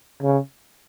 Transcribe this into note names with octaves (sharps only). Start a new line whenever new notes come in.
C#3